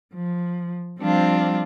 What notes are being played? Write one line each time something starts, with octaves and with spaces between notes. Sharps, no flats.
F3
F3 G3 C4 D4 F4